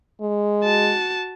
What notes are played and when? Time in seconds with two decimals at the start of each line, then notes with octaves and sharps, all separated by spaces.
0.21 G#3
0.64 F#4 A5